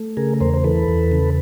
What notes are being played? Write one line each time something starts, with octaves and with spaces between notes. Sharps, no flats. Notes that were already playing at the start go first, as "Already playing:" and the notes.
Already playing: A3
C#3 G#4 A#4
E2 A#4 C5
C5
E3 A4 B4
E2
C#3